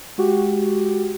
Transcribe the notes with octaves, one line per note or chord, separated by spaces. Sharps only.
G#3 F#4 G4